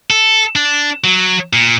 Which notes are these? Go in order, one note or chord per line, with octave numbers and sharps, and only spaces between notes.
A4
D4
F#3
A#2